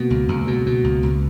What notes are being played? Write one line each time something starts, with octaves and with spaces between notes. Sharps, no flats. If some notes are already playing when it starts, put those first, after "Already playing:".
Already playing: B2 A#3
C#2
C#2
B2
B2
C#2
C#2